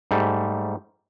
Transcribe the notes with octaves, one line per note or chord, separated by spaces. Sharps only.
G#2 G3 A3